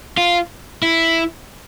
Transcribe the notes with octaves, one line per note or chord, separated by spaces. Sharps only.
F4
E4